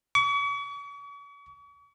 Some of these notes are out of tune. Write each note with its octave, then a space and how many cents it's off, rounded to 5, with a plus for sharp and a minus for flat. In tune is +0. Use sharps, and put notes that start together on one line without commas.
C#6 +45